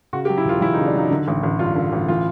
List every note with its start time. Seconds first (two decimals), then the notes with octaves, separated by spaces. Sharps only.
0.13 C#3 F#4
0.25 G4
0.29 F#3
0.37 E4
0.45 E1 F4
0.61 E2 E4
0.74 D#4
0.77 C#3
0.87 D4
0.94 F#3 D#4
1.11 D3
1.28 A1
1.43 A1
1.59 G2 F4
1.76 D3
1.92 A1
2.08 E3 F4